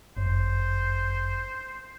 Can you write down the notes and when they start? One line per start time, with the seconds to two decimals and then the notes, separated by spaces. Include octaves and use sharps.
0.17 G1 F#2 C5